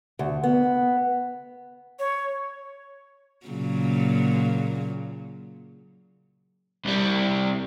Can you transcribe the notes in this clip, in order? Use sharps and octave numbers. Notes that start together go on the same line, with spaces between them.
D2
B3
C#5
A#2 C#3 F#3
C2 G3